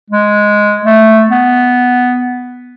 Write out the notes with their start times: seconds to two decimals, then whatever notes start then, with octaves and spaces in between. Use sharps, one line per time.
0.10 G#3
0.85 A3
1.30 B3